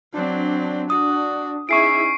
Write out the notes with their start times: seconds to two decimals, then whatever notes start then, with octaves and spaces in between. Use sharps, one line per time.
0.14 F#3 C4 D4
0.90 F#4 D#6
1.69 C#4 D#4 E4 G#4 E5 C#6 C7 D7